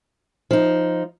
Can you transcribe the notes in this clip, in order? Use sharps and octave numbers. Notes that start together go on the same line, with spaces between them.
F3 D#4